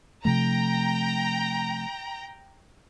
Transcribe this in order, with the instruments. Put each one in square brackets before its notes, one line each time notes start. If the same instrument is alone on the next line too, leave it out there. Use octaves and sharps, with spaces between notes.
[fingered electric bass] C3 F3 A3 [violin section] G5 A#5